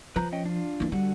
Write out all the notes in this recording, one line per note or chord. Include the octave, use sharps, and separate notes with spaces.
F3 B4 A#5 G6
C#4 D#5 G5
D4 F4
E3 A#3
D3 G3 F#4